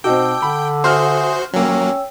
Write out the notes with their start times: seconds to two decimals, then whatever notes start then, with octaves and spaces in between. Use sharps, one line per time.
0.04 B2 C4 D#4 F#4 G5 A5 D6 E6
0.42 D3 B5
0.84 F#4 C5 E5 G#5 C6 D#6 F6
1.54 F#3 A#3 C#4 C#5 G5 E6